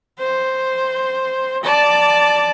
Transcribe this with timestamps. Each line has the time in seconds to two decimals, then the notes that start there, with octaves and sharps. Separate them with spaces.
0.19 C5
1.63 D5 A5